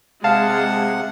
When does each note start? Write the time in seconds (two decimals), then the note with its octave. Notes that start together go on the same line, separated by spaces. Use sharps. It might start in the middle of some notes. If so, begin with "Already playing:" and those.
0.24 C3 G#3 F5 F#5 A5